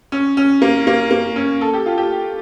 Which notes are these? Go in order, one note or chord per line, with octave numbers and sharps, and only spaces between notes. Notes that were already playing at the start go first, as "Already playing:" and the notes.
C#4
C#4
A#3
A#3
A#3
C#4
A4
G4
F4
G4